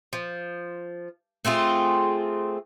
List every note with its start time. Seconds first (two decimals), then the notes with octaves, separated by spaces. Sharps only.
0.13 F3
1.45 A3 C4 F4 G#4